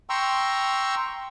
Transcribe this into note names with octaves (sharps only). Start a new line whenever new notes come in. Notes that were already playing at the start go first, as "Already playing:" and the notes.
G5 A#5 C6 C#6 E6